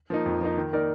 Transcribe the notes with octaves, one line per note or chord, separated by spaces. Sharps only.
F3 A#3 D#4
F2
F3 A#3 D#4
D#3
A#3 D#4 A#4 D5